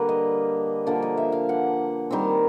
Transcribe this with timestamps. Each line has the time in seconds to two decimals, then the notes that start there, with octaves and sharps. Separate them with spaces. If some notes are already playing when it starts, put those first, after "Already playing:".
Already playing: D3 G3 A#3 B4
0.09 D#5
0.86 D3 F3 A#3 D5
1.02 D#5
1.17 E5
1.32 F5
1.49 F#5
2.11 D#3 G3 C4